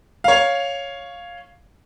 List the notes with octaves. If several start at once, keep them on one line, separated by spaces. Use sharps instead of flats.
C#5 F5